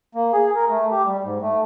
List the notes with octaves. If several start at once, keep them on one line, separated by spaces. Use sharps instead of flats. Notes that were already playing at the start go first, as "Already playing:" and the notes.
A#3
G#4
A#4
A3
G4
G3
G#2
A3